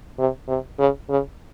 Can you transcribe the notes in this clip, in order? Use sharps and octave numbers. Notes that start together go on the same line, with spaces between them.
C3
C3
C#3
C#3